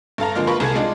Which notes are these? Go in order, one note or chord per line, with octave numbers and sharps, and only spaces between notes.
G2 A4 F5 A#5
D3 F3 G#3 A#3 F6
F4 A#4 B4 B5 C#6
C2 C3 G#4 A4 G#6
G#3 D4 D#4 F4